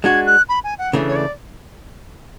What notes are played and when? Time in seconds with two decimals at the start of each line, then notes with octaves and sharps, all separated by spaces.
0.04 G#3 D4 F#4 G#6
0.27 F#6
0.49 B5
0.64 G#5
0.78 F#5
0.93 C#3 E3 A3 D4
1.08 C#5
1.16 D5